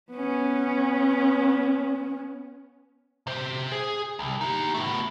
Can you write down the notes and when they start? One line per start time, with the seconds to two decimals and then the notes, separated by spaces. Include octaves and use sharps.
0.12 B3 C#4
3.27 C3 C5
3.72 G#4
4.19 C2
4.41 D#4 G4
4.74 A3 B3